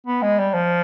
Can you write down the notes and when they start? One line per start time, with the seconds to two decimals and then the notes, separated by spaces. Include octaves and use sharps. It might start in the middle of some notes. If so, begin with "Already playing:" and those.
0.07 B3
0.22 G#3
0.39 G3
0.54 F3